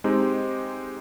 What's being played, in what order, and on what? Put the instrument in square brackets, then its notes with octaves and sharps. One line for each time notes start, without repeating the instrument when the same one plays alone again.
[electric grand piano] G#3 C4 D#4 G4